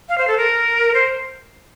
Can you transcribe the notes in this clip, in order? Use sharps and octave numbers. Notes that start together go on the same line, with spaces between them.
F5
C5
A4
A#4
C5